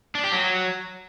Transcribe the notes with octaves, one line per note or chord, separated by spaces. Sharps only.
D4
G4
F#3